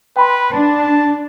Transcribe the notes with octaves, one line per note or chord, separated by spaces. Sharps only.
B4 G5 B5 C6
D4 A5